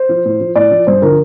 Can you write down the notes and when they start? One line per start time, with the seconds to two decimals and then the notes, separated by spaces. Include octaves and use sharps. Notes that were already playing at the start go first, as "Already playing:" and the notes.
Already playing: C5
0.09 F3
0.25 A2
0.40 F3
0.56 A2 D5
0.71 F3
0.87 G2 C5
1.02 D3 F3 A#4